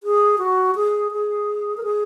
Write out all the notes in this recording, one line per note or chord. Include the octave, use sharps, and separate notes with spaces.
G#4
F#4
G#4
G#4
A#4
G#4